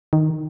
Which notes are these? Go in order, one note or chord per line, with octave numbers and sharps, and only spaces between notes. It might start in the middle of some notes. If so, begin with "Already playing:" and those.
D#3